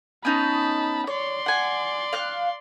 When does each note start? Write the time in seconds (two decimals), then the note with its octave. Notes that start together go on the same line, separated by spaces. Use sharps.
0.25 B3 C#4 D#4 A5 B5
1.07 C#5 D5 C6
1.46 F#5 G#5
2.13 F5 F#6